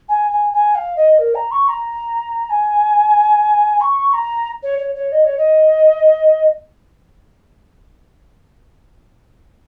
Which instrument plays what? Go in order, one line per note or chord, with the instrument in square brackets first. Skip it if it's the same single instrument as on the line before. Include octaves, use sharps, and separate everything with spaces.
[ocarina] G#5
G#5
G#5
F5
D#5
A#4
A#5
C#6
A#5
G#5
C#6
A#5
C#5
C#5
C#5
D#5
C#5
D#5